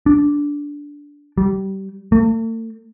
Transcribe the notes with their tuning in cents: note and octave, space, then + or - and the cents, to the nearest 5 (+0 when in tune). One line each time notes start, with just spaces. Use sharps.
D4 -10
G3 -25
A3 +45